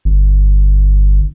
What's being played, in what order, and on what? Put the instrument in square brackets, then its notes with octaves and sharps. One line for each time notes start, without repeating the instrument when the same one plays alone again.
[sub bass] G1